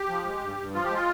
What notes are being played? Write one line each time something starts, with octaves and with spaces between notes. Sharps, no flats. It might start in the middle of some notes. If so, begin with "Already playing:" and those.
Already playing: G4
F3
G#3
G2
G2
F3 F4
G4
G#3 F4